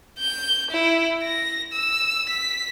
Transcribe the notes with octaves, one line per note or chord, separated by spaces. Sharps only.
G6
E4
A#6
E6
B6